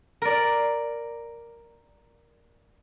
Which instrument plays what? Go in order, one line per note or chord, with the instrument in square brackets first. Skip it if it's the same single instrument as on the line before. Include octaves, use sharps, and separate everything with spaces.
[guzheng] A#4 D5